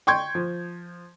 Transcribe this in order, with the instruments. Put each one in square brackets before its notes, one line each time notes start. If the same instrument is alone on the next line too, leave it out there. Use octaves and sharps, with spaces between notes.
[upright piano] G5 C6 C#6 G6 G#6
F3